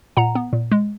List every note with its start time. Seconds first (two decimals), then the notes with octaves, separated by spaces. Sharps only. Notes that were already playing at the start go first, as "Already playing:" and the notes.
0.17 A#2 F#5 A#5
0.35 B3
0.53 A#2
0.72 G#3